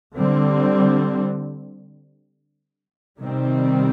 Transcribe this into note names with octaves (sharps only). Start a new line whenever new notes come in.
D3 G3 C4
C3 D#3 G3 C4